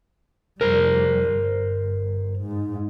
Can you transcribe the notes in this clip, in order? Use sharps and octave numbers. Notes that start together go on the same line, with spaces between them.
F1 G3 A#4 C5
G1
G#2